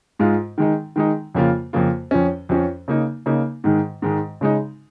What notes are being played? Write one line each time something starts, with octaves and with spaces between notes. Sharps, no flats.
G#2 G#3 F4
D#3 G#3 D#4
D#3 G#3 D#4
F2 C#3 A#3 F4
F2 C#3 A#3 F4
F2 F3 C#4
F2 F3 C#4
C#3 A#3 D#4
C#3 A#3 D#4
G#2 D#3 G#3
G#2 D#3 G#3
C#3 G#3 D#4